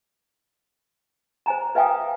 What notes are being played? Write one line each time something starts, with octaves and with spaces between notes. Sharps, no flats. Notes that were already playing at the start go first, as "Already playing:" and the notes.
C5 G#5 A#5
B4 E5 F5 G5 G#5 D#6